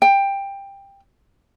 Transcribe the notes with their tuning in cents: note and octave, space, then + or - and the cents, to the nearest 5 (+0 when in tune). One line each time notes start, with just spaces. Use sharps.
G5 +15